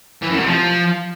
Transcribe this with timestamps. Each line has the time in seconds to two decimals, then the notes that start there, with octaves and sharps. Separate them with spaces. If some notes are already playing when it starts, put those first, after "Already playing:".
0.22 E3
0.30 F#2
0.38 C3
0.46 F3